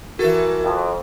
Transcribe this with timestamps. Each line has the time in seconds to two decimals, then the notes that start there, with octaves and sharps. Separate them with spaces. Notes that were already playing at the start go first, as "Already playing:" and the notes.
0.19 E3 F#4 A4 A#4
0.62 F2